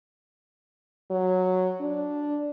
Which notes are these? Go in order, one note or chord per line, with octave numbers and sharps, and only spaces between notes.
F#3
D4